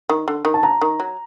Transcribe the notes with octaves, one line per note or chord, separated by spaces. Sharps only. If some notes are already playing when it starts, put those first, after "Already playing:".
D#3
D3
D#3
A5
F#3 A#5
D#3
F#3